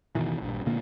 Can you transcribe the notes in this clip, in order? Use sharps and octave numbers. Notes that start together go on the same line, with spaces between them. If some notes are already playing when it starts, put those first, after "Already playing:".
F#1 B2 D#3 E3
A#1 G2
A#2 D3 A#3